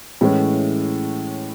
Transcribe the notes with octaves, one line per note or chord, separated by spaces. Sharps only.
A2 E3 G#3 C#4